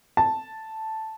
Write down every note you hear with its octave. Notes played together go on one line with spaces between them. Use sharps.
A5